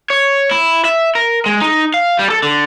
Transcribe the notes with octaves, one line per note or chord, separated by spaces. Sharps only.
C#5
E4
E5
A#4
G#3
D#4
F5
G3
A4
D3